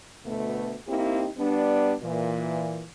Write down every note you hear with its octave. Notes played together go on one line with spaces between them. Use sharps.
D2 B2 A3 B3
A#3 C4 D#4 E4 G4
G3 B3 D4
A#2 E3